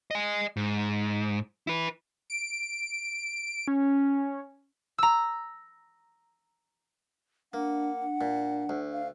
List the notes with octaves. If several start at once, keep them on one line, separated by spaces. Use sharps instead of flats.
D#5 G#5
G#2
E4 B4
D7
C#4
A#5 E6
A#3 D4 F#5
D4
A#2
D2
F5